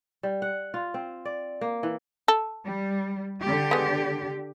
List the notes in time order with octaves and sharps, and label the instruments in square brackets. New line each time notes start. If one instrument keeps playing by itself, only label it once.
[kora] G3
F#5
F4
C4
D5
A#3
E3
[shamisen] A4
[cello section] G3
D3 G4
[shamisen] G#3 B3